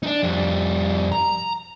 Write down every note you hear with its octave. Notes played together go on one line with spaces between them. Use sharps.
D4 D#4
F2 G3
A#5